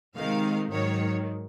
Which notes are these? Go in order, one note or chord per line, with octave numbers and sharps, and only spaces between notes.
C3 D#3 G#3 F5
G#2 D#3 F#3 C#5